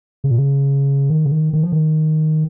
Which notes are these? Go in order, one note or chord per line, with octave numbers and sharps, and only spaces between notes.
C#3
A#2
C#3
D#3
C#3
D#3
D#3
F3
D#3